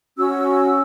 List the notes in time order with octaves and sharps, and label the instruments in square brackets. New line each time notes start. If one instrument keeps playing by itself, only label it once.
[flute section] C#4 F#4 E6